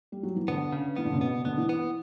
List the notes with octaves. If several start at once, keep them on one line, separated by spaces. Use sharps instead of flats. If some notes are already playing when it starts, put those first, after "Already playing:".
G3
F#3
E3
D3 B3
C#3
E3 B3
D3
C#3
B2 B3
D3 B3
E3
B3